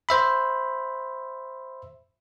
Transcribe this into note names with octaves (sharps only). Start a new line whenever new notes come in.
C5 E5 B5